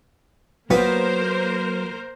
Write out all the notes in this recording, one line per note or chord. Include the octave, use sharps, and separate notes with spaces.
F#3 A#3 B3 F4 A#4 C5